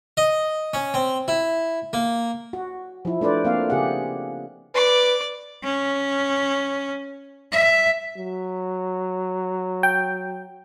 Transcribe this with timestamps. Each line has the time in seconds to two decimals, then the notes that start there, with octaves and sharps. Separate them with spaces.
0.17 D#5
0.74 C#4
0.94 C4
1.28 E4
1.93 A#3
2.53 F#4
3.05 F3 E4
3.21 A3 D4 B4 C5 D5
3.44 A#3 C4 F5
3.70 C#3 G4 G#4 F#5
4.75 B4 D5 D6
5.64 C#4
7.52 E5
8.17 F#3
9.83 G5